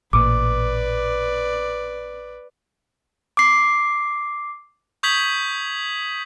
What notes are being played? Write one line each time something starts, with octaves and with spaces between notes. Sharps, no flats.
A1 A#2 B4 D5 D6
D6 C7
C#6 D#6 G6 G#6 B6 F#7